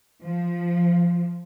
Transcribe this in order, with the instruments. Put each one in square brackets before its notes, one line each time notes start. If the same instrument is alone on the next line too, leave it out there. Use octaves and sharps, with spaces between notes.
[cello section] F3